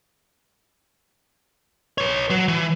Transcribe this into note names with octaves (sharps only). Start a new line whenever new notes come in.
B4 C#5
F#3
E3